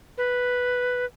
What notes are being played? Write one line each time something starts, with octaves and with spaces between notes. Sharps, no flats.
B4